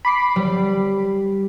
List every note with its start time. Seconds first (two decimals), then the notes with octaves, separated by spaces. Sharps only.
0.05 B5 D6 C7
0.36 G3